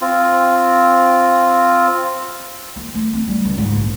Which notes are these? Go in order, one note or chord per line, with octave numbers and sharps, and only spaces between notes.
C4 F4
A#3
A3
C4
G3
C#2
G#2
A#1